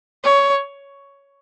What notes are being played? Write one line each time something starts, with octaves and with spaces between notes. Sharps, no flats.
C#5